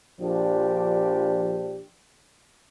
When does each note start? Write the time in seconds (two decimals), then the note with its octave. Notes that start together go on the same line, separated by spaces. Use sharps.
0.20 A#1 F3 D4 G4